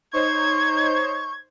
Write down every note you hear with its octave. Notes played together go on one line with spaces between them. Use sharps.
D#4 C5 C#5 C#6 G#6